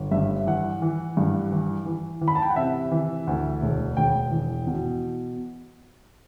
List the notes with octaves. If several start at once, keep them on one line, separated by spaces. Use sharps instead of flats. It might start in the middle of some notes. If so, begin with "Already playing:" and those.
Already playing: G1
G2 E5
E3 F#5
E3
G2
E3
E3
E3
B5
A5
G5
F#5
C3 E5
E3
D2
E1
E1 G5
E3
B2